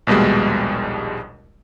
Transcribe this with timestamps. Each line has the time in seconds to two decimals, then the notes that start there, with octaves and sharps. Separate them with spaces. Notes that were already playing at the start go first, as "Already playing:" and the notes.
0.07 A#1 D#2 B2 G3 G#3